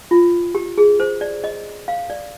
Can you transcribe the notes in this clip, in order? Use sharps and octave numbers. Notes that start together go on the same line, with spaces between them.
F4
G4
G#4
C5
D5
D#5
F5
D5